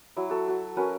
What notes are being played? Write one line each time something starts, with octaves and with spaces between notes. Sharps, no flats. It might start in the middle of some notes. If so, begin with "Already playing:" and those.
F#3 E4
F#4 A4
F#4
C#4 F#4 A#4 B4